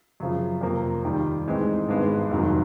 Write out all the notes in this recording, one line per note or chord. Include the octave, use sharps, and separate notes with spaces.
F#2 C#3 F3
F2 C3 F3 A#3
D#2 D#3 G3
A2 E3 G#3 C4 D#4
G#1 G2 D#3 G#3 B3
F1 D#2 D#3 F#3